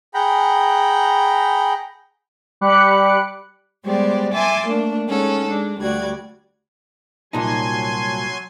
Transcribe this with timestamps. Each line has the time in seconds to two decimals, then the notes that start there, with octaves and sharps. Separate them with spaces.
0.14 G#4 F#5 G5 A#5 B5
2.61 G3 G4 B5 D6 F#6 C#7
3.84 G3 G#3 B3 G4 C5 D5
4.33 E5 G#5 A5 C6 D6
4.65 A3 A#3 D4
5.08 G#3 C#4 D#4 A4 F#5
5.46 G#3 D4
5.80 D2 G3 F#4 D5 G#6
7.33 C2 A#2 F#3 D#4 G#5 A5 C6